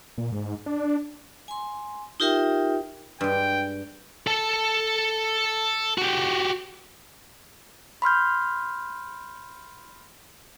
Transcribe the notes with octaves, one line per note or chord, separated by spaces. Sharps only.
A#2
G#2
D4
G#5 C6
D#4 F4 G4 A#4 E5 G5
G2 G#3 G5
A4 A5
F#4 G4
B5 C6 F6 G6